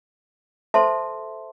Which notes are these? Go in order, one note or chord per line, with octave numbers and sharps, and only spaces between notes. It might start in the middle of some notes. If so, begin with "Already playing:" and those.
A4 C5 E5 A5 C6